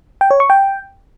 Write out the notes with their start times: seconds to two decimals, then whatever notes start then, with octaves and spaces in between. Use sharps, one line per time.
0.21 G5
0.31 C#5
0.40 C#6
0.50 G5